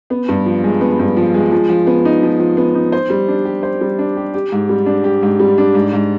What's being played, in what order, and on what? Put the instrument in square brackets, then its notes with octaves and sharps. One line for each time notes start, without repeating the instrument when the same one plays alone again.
[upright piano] B3
G2
F3
G#3
B3
G2
F3
G#3
F3
F3
B3
D#4
F3
F3
B3
D#4
C5
G3
D4
G4
C5
G3
D4
G4
G4
G#2
G3
D4
G4
G#2
G3
D4
G#2
G#2